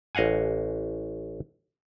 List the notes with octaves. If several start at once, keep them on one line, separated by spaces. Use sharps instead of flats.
A1 D#5 F5 F#5 G#5